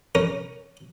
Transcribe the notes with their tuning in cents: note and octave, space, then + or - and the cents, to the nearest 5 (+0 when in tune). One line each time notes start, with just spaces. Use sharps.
C#4 +0 A#4 +0